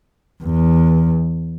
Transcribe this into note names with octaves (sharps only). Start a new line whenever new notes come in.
E2